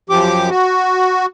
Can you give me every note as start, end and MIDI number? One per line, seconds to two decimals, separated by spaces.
0.10 0.50 42
0.10 0.50 53
0.10 0.50 67
0.10 0.50 86
0.50 1.26 66